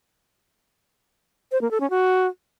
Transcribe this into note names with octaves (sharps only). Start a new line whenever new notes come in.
C5
A#3
A4
C#4
F#4